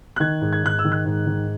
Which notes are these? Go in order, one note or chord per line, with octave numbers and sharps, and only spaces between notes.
F#6
D#3 G#6
G#2
G#6
G#2 F#6
E6
D#3
F#6
G#2
D#3